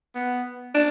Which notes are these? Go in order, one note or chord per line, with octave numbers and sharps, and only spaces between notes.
B3
D4